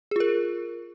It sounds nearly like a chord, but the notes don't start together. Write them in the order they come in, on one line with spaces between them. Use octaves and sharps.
G#4 F4 A#4